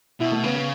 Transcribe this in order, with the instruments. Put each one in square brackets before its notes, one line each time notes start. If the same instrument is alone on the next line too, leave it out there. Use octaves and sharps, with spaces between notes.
[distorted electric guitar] B2 [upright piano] E4
[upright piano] A3
[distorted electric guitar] C#3 [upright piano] B3
[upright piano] B3